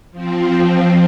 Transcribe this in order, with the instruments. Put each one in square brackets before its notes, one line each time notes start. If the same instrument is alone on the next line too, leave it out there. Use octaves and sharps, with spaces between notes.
[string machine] F3 C4